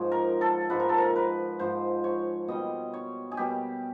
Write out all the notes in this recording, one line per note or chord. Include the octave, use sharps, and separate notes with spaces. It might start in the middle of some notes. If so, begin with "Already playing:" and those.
Already playing: G#2 F3 C#5
A#4
A4
G#2 F3 B4
A#4
A4
A#4
B4
G#2 F3 C5
C#5
B2 G3 D#5
C#5
G#4
B2 G3 G4